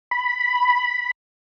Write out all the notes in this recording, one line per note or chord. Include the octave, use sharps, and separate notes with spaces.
B5